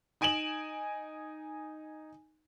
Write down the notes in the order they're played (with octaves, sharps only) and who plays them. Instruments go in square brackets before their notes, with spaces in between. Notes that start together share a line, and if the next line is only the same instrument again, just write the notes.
[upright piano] D#4 G#5 D7 E7 F#7